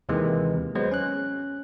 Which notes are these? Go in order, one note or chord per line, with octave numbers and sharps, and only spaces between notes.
D#2 C3 D#3 E3 G#3
F#3 G#3 B3 B4 C5
C#4 F#6